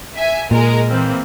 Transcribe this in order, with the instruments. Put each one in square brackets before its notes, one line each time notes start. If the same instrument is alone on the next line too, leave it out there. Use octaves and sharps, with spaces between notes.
[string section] E5 G#5
[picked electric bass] A#2 [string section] G#3 A#4
[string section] E3 A#3 C4